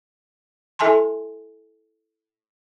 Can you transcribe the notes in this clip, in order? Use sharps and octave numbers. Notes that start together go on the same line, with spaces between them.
E4 A4 E5 G#5 A5 C6